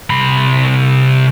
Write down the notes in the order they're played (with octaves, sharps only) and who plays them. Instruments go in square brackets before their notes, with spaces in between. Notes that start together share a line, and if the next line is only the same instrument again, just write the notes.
[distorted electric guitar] C2 B5